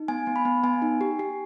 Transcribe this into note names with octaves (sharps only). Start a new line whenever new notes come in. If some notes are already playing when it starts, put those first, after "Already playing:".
Already playing: D#4
B3 G#5
B3
B5
B3
B3 G#5
D#4
G4
G4